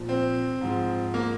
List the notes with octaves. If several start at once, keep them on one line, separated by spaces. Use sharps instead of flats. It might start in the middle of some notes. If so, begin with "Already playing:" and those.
Already playing: A#2 F3
C4
G#2 F3
A#3